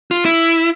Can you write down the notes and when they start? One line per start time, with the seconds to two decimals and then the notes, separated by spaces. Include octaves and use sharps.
0.11 F4
0.25 E4